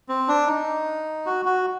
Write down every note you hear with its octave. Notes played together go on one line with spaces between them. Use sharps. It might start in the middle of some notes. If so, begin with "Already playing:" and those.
C4
D4
D#4
F#4
F#4